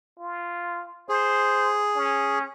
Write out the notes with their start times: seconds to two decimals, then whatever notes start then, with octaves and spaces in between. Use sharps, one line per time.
0.19 F4
1.09 G#4 C5
1.96 C#4